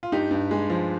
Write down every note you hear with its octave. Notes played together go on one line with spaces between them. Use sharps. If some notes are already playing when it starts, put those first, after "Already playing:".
F4
G2 D#4 G4
G2
G#3
F3